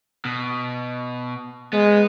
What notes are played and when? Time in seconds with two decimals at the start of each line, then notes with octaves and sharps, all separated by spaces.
0.25 B2
1.73 G#3 B3